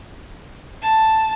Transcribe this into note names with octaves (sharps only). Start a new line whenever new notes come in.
A5